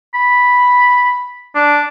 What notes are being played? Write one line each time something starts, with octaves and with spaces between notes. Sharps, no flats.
B5
D4